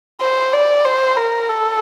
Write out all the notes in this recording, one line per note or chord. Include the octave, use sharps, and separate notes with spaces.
C5
D5
C5
A#4
A4